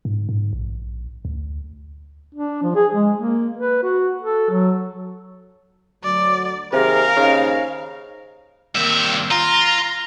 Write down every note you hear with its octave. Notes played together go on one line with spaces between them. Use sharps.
G#2
G#2
A#1
D2
D4
F3
G#4
G#3
A#3
B4
F#4
A4
F#3
D2 F#3 D5
D#2 C3 G#4 A#4 F5
D#2 C#3 D#4 C5
G2 D#3 A#3 C4 E5
F4 A#5